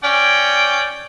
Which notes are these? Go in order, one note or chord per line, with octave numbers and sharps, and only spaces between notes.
C#4 D5 G5